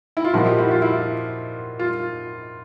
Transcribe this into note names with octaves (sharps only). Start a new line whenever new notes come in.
E4
F4
A#2 F3 A#3 D#4 E4 F#4
F4 G4
E4 F#4
F4
E4
F4